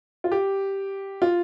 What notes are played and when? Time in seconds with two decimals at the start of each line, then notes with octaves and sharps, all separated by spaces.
0.24 F4
0.32 G4
1.22 F4